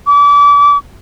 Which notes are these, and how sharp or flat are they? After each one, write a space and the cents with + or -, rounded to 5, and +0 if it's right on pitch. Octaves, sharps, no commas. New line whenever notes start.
D6 -35